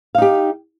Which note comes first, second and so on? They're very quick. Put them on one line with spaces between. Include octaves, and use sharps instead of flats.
F5 D#4 G4